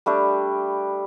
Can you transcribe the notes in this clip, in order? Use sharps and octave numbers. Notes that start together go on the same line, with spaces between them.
G3 A3 D4 G4